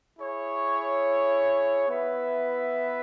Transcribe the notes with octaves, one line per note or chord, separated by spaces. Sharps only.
E4 G#4 C#5
B3 E4 B4 E5